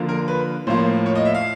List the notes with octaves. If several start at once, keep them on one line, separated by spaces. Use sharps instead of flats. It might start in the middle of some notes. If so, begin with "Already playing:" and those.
Already playing: D3 F3 A#3
A#4
B4
A2 F3 A#3 C5
C#5
D#5
E5
F5